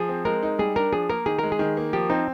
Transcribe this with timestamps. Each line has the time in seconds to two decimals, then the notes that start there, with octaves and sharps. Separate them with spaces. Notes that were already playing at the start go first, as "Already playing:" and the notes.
Already playing: F3 G#4
0.09 C4
0.25 G#3 A#4
0.43 D#4
0.59 G3 G#4
0.76 D4 A#4
0.92 F3 G#4
1.10 A#3 A#4
1.26 D#3 G#4
1.39 G#3 A#4
1.52 G#4
1.59 D#3
1.77 A#3
1.93 F3 G4
2.10 C4 D#4